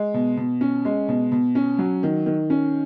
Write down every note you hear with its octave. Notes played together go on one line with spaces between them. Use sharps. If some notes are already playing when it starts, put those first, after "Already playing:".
Already playing: G#3
B2
B2
C#4
G#3
B2
B2
C#4
F#3
D#3
D#3
C#4